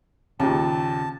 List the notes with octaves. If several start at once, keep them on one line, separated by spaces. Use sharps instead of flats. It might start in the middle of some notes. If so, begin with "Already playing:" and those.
D#2 A#2 C#3 A5